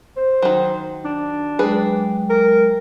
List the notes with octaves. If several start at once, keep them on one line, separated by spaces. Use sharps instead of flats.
C5
D#3 F#3
D4
F#3 G#3 G#4 B4 G5
A#4